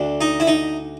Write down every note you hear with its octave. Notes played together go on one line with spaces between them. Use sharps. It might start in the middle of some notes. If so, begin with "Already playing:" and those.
Already playing: D2 D3
D#4
E4
D#4